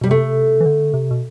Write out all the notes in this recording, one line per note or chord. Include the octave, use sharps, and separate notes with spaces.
B2 G3
C3 A3
E3
D3
C3
B2